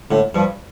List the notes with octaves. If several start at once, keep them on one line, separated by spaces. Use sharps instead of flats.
A2 D3
G2 F3